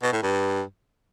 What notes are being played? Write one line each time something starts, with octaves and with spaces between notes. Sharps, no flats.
B2
A2
G2